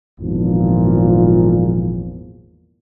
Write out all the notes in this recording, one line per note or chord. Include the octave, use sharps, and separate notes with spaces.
G#1 E2 A#2 F3